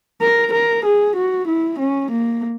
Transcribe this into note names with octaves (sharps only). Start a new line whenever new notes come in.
A#4
A#4
G#4
F#4
E4
C#4
A#3